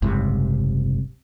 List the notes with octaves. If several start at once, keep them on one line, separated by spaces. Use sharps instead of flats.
F#1 C2 G#2 C3